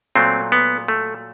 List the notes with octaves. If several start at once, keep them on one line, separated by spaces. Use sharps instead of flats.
A#2 F#3 A3 C4
B3
A3